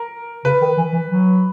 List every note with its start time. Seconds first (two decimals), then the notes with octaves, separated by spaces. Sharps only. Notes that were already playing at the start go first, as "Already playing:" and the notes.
Already playing: A#4
0.45 C#3 B4
0.61 D#3
0.77 E3
0.93 E3
1.09 F#3